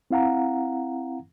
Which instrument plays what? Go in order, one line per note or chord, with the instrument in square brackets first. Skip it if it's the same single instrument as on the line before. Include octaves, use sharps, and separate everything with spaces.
[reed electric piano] C4 E4 F5 F#5 A#5